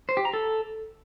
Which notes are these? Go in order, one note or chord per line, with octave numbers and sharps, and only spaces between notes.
C5
G4
A#5
A4